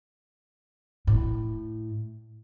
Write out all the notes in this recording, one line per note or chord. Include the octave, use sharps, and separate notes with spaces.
A2